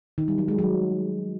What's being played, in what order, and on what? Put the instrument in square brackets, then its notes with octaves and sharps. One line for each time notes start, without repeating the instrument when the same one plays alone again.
[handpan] D#3
G3
F#3
G#3
F#3